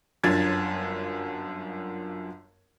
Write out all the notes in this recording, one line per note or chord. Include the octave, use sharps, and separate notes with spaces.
G1 F#2 D4 F4 G#6 A6